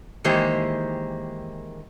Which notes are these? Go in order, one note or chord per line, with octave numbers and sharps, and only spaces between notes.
D#3 E3 G#3 A#3 G4 C5